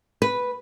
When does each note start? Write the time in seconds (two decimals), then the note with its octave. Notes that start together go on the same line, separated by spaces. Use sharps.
0.22 B4